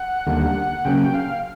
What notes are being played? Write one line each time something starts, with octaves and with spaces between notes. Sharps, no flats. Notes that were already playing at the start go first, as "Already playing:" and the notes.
Already playing: F#5
D#2 D3 G3 A#3
C#3 F#3 A#3 C#4 G5
F5